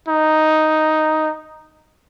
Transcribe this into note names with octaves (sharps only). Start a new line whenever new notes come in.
D#4